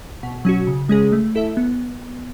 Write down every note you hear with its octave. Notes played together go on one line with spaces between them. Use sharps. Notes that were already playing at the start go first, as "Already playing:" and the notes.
B2
F#3 C#4 F#4
C#3
G#3 C#4 G#4
A3
E4 A4 E5
B3